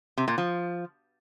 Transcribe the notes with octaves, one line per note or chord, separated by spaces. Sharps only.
C3
A#2
F3